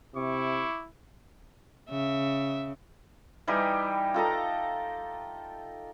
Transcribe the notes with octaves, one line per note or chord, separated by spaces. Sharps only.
C3 E4 C#6 D6
C#3 E5
E3 G3 D#4 G4
F4 A4 D#5 A#5